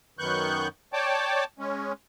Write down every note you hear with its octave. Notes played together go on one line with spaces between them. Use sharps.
F#2 D#3 B3 C#6 F#6 G6
C#5 D5 G5 A5 D6
G#3 C#4